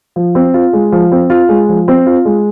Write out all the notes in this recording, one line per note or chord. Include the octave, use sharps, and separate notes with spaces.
F3
C4
F4
G#3
F3
C4
F4
G#3
F3
C4
F4
G#3